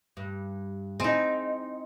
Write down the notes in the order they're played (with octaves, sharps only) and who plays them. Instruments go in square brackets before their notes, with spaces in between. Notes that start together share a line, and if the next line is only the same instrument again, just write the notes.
[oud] G2
[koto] C4 D#4 [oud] E4 G#4